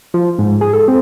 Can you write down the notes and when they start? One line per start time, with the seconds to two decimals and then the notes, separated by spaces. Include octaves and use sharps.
0.14 F3
0.38 G#2
0.61 G#4
0.73 A4
0.88 C4